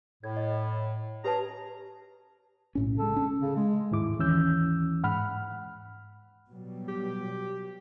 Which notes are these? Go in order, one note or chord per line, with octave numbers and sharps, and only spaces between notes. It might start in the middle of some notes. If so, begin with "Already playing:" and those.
A2 G#6
D#5
C#4 G4 G#4 B4 A5 A#5
B1 A2 C#4
C#3 G#3 A4
C#4
C#3
G#3
D#2 G#2 E4 D6
D#2 E3 C#4 E6 G6
G#2 F#5 B5 F6
B2 F#3 G3
G4